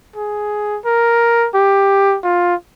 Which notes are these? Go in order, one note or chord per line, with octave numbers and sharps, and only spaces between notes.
G#4
A#4
G4
F4